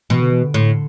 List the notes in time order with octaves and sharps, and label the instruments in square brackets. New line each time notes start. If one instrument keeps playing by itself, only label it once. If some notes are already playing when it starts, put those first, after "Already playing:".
[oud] B2 [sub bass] E3
[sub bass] D3
E3
D3
[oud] A2